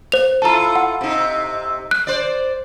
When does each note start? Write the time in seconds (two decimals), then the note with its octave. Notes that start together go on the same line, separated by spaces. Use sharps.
0.12 C5 F7
0.42 E4 F4 A4 A5 A#5
0.76 F#5
1.01 C3 D#4
1.91 F#6
2.07 C5 D5